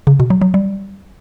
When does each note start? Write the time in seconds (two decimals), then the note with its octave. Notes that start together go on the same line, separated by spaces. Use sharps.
0.07 C#3
0.20 B2
0.30 F#3
0.41 F#3
0.54 G3